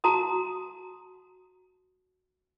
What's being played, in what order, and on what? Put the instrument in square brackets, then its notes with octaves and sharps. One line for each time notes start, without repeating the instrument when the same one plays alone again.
[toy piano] F#4 A5 A#5 D#6